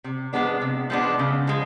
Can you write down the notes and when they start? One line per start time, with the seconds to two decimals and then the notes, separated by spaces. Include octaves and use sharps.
0.04 C3
0.33 F3 G#3 B3 D4
0.61 C3
0.90 F3 G#3 B3 D4
1.19 C#3
1.47 F3 G#3